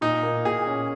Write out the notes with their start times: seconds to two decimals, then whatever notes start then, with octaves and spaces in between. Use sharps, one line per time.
0.01 A#2 D#4
0.23 A#3
0.45 A#2 G#4
0.67 C#4